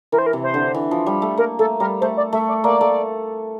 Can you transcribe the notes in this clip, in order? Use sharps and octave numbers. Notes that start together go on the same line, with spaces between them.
E3 A#4
C5
A#4
C3
C5
D3
E3
F3
G3
A3
A#3 A#4
A3 A4
G3 A#4
A3 C5
D5
A3 E5
D5
A#3 D5
A3